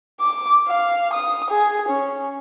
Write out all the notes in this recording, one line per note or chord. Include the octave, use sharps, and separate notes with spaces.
D6
F5
D#6
G#4
C#4